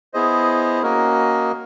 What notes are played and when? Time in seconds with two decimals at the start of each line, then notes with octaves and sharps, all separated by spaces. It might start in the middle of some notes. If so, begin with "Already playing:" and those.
0.14 B3 E4 G#4 C5 D#5
0.83 A#3 C#4 F#4 A#4 D#5